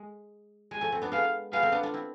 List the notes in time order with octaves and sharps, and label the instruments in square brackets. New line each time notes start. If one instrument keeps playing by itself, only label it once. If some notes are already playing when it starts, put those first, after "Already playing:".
Already playing: [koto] G#3
[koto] G#3 [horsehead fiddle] G#5
[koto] F3 A3
A3 C4
B3 D4
[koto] G#3 B3 [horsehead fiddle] F5
[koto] G#3 B3 [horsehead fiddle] F5
[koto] A3 C4
B3 D4
D4 F4
C4 E4